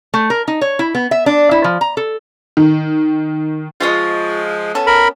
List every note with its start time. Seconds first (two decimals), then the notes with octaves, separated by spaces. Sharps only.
0.14 A3
0.30 A#4
0.48 D#4
0.61 C#5
0.79 E4
0.95 B3
1.11 E5
1.26 D4
1.51 E4
1.64 F3
1.81 A#5
1.97 A4
2.57 D#3
3.80 F3 G#3 F4 C#5 D#5
4.75 B3 C#4 A4
4.87 A#4 B5